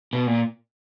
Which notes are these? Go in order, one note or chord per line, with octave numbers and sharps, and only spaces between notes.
B2
A#2